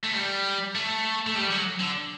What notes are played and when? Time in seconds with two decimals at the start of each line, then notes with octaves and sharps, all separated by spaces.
0.04 A3
0.15 G3
0.76 A3
1.27 A3
1.35 G3
1.51 F#3
1.80 D3